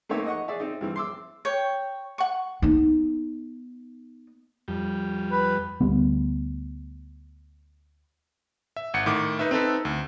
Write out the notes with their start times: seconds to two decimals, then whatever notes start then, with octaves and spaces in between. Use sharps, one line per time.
0.09 A3 A#3 C4 D#4 C#5 E5
0.26 D#5 F#5 C#6
0.48 G#4 D5 E5
0.60 C4 D#4
0.81 G2 E3 C4
0.96 C6 D6 E6
1.45 C#5 G5
2.18 F#5 C#6
2.62 B3 D#4
4.68 F2 G3
5.31 B4
5.81 D2 G3 B3
8.77 E5
8.94 G#1 F#5 C#7
9.06 A2 D#3 D6
9.39 D#4 B4 E5
9.51 C4 D#4 A4 B4
9.85 D2